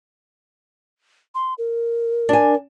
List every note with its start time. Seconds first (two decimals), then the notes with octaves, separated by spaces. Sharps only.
1.35 C6
1.58 A#4
2.29 D4 G#5